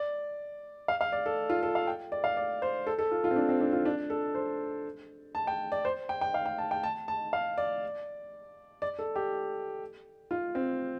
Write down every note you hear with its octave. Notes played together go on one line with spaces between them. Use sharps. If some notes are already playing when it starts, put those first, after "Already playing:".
Already playing: D5
F5
F5
D5
A4
F4
A4
F5
G5
D5
F5
D5
C5
A4
A4
F4
F4
C4
D4
C4
D4
F4
D4
A4
C5
A5
G5
D5
C5
G5
G5
F5
G5
A5
G5
A5
A5
F5
D5
D5
A4
G4
F4
C4